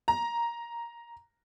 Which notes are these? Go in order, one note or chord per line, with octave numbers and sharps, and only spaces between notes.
A#5